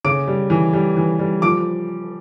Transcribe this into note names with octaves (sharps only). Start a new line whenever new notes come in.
C#3 D6 D7
G3
E3
G3
E3
G3
F3 D6 D7